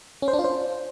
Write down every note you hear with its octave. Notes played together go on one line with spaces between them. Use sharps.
C#4
C5
D4
F4
C5